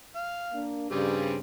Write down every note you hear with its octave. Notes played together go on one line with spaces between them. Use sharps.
F5
A#3 D4
G2 C#3 G3 C4 G#4